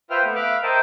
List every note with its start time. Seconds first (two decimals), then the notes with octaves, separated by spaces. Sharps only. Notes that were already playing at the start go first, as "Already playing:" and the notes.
0.10 F4 B4 C5 E5 G5 F6
0.24 A3 B3
0.36 E5 F5 B5 D6 F6 F#6
0.63 A#4 C5 D#5 E5 G5 A5